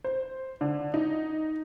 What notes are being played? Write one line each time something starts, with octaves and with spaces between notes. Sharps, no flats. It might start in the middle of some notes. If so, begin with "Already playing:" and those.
C5
D3
D#4